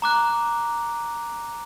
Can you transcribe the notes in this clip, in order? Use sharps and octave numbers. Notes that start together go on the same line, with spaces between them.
A#5 D6 F#6